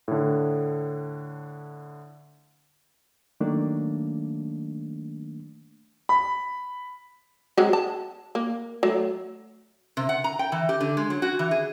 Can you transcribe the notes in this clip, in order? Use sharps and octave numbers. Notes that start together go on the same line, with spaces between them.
A2 D3
D#3 F#3 A3 A#3 D4
B5
F#3 G#3 C4
A5
A#3
F#3 A3
C3
F#5
A#5
G5
E3
G4
D3
G#3
F#3
F#4
E3
G#4